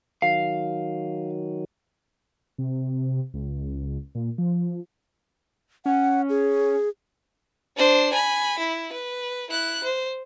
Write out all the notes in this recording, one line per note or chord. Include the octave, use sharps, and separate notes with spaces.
D#3 F#3 F5
C3
C#2
A#2
F3
C#4 F#5
G#4
D4 C5
G#5 B5
E4
B4
E4 F#6
C5